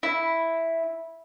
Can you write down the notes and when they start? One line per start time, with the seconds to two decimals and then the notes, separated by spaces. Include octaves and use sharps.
0.03 E4